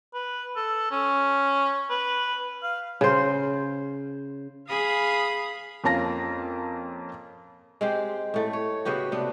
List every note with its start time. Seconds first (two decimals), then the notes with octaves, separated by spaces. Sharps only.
0.14 B4
0.56 A4
0.91 C#4
1.90 B4
2.64 F5
3.01 C#3 C5
4.69 G#4 F5 B5 D#6
5.84 F2 A#3 C#4 F5 A5 A#6
7.81 G#3 C4 G4
8.34 A2 A3
8.53 C#5
8.85 C#3 B3 F#4 G4
9.12 C3 B3 D4